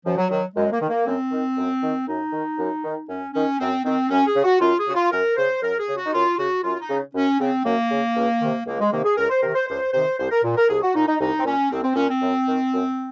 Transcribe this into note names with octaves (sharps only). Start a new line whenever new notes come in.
F#2 F3
F#3
D#3 F#3
F#2 G#3
A#3
D#3
A#3
F#2 C4
D#3
F#2
D#3
F#2 D#4
D#3
F#2
D#3
F#2 C#4
D#3 C#4
F#2 C4
D#3 C4
F#2 C#4
G#4
C#3
F#4
F#2 F4
G#4
C#3 F#4
F4
F#2 A#4
C#3 C5
F#2 A#4
G#4
C#3
F#4
D#4
F#2 F4
C#3 F#4
F#2 F4
D#4
C#3
F#2 C#4
C#3 C4
F#2 A#3
C#3
C#2
C3 D#3
C#2 A#3
G#3
C3 D#3 A#3
G#4
C#2 A#4
C5
C3 D#3 A#4
C5
C#2 C5
C3 D#3 C5
C2 C5
A#4
A#2
A#4
C2 G#4
F#4
A#2 D#4
D#4
C2 D#4
C4
A#2 C#4
C2 C4
C4
A#2 C#4
C4
F#2
D#3
F#2